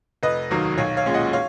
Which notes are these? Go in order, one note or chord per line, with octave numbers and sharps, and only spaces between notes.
F1 B4 D#5
D#2 D#3 F#3 A#3
B1 C#5 F5
C#5 F5
A#2 G#3 C#4
D#5 F#5
C#5 F5